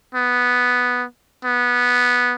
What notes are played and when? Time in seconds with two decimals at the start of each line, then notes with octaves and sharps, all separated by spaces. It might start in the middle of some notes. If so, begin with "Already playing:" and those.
0.15 B3
1.44 B3